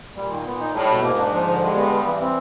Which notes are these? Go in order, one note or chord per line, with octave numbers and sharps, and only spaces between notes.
A#2 G3
D#3
B3
D#4
A2 G3
B2
G#2 A#3
D4
F3
D3
G2 G#3
B3
G3
E3
C4